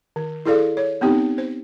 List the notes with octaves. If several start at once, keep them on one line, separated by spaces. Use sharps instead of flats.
D#3
E4 G#4 A4 D5 F5
C#5
B3 C4 D#4 G4
C5